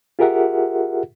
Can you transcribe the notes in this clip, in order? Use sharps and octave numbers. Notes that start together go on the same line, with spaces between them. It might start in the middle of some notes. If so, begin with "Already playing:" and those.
F4 G4 G#4 A#4 E5 F#5